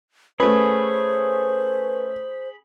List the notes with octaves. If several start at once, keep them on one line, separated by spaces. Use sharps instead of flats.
A3 C#4 G#4 B4 C5 B5